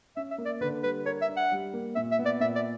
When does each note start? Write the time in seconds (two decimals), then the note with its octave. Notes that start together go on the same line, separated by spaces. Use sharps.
0.16 C#4 E5
0.31 E5
0.38 A#3
0.46 D5
0.61 D3 B4
0.83 G3 B4
1.06 A#4 C#5
1.22 E5
1.29 D4
1.37 F#5
1.52 G3
1.73 A#3
1.96 A#2 E5
2.12 E5
2.19 B3
2.26 D5
2.40 A#2 E5
2.55 D5